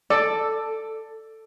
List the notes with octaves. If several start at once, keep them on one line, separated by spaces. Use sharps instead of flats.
A4 D5